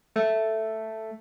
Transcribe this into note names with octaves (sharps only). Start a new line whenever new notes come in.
A3